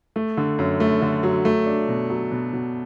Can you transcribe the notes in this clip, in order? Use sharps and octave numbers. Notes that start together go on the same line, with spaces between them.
A3
D3
F#2
A3
D3
F#3
A3
D4
B2
F#3
B2
B2